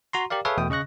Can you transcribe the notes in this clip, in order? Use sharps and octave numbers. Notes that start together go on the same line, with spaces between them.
F#4 A#5 C6
G4 A#4 D5 F5
G#4 A4 B4 C#5 E5 F5
E2 B2 A3 G5 D#6
C#3 D#5 C#6 F#6 A#6